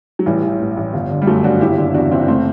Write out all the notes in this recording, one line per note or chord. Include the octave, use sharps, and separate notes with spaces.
F#3
A1 E3 G3
E3
A2
A1
G1
D3
G3
F#2 F#3 A3
G1 D4 F#4
F#1 E4 G4
D3
G4
E2 D4 F#4
F#1 C4 E4
A3 C4